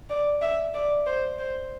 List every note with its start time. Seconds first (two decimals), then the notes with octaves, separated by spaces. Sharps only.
0.10 D5
0.42 E5
0.74 D5
1.06 C5
1.39 C5